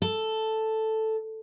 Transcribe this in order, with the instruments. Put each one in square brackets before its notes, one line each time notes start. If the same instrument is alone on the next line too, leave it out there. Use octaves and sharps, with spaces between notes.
[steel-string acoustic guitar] A4